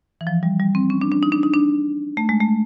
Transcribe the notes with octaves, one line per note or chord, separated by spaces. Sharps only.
E3
F3
G3
G3
C4
C#4
D4
D4
D#4
D4
D#4
D4
A3
G#3
A3